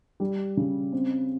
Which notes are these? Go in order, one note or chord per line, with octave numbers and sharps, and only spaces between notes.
G3
C#3
C4